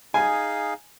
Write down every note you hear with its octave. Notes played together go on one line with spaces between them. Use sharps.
D#4 G#4 F5 G#5